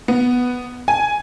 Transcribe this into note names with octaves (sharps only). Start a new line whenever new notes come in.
B3
G#5